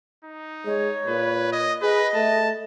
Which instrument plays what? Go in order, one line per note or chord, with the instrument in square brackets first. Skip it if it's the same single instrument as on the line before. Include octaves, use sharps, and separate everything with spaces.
[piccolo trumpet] D#4
[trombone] G#3 [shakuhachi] C#5
[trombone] A#2 [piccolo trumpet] B4
[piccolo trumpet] D#5
[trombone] G#4 [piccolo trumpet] B4 [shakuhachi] D#5
[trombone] A3 [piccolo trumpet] A5